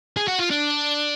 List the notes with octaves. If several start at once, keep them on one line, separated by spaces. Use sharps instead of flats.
G#4
F#4
F4
D4